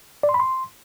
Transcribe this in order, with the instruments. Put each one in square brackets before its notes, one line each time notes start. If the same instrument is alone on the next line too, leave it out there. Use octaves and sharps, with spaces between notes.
[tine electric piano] D5
C6
B5
C6